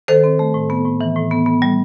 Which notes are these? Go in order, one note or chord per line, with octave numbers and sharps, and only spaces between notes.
D#3 A4 C5
C4
A3
A2
B3
A2
E3
A2
B3
B3
G3